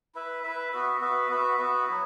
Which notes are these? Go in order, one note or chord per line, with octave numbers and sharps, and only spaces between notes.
E4 B4 E5
E4 B4 E5
B3 F#4 B4 E5
B3 F#4 B4 E5
B3 F#4 B4 E5
B3 F#4 B4 E5
F#3 B3 E4